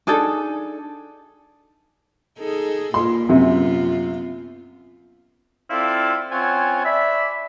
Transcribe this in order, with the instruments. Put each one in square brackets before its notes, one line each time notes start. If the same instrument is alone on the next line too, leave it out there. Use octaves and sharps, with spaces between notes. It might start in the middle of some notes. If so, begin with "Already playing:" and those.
[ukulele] D4 D#4 G#4 A4
[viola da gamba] D#4 G#4 A4
[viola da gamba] A#2 F4 [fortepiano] C6
[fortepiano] F#2 C3 [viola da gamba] B3 F4
[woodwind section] C4 E4 F4 A4 D5 F5
C4 C#4 F4 C#5 F#5 G#5
D5 E5 B5